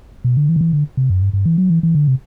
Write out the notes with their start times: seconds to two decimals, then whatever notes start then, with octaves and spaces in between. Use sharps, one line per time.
0.24 B2
0.37 D3
0.49 E3
0.56 D3
0.61 E3
0.73 D3
0.97 C3
1.10 F#2
1.22 G2
1.33 G2
1.46 E3
1.58 F#3
1.70 E3
1.83 E3
1.95 D3
2.08 C3